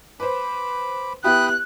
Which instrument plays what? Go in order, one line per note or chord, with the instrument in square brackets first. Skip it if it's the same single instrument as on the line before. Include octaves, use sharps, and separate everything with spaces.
[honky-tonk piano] B4 C5 [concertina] B5 D6
[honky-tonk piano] B3 E4 G4 [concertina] G5 B5 D#6 [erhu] F#6